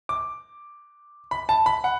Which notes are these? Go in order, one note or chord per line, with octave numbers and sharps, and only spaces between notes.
D6
B5
A5
B5
F#5